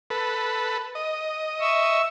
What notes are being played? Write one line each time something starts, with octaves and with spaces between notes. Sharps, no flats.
A4 B4
D#5
E5 C#6 E6